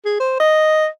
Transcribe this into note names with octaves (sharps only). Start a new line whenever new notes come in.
G#4
C5
D#5